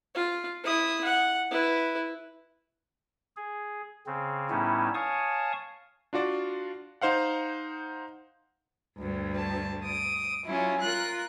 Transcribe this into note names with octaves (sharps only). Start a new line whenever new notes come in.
F4
E4 D#6
F#5
E4 B4
G#4
C#3 C4
A2 G3 B3 C#4 D#4 E4
C#5 F5 G#5 A5 C#6 D#6
D4 F4 F#4 D5
D#4 C5 F5 F#5
D2 G2
A5
D#6 D7
F#3 C#4 E4 F4
F4 A#4 F#6